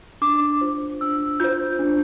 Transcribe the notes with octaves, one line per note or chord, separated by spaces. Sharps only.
D4 D6
F4 C5
D4 E6
F4 C5 G6
D4